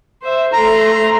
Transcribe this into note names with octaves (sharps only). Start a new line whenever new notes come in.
C5 E5
A3 A#5 C6